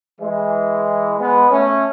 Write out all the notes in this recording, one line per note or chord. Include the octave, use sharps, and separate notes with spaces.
E3 G#3
G#3 B3
A3 C#4